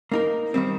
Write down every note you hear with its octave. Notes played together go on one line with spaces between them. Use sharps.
A#3 D#4 A#4
D#3 G3 C4